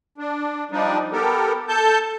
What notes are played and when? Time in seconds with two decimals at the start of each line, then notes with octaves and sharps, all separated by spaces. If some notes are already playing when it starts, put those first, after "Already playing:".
0.18 D4
0.71 F3 G3 D4 D#4
1.12 B3 G4 A4 A#4
1.68 A4 A5 G6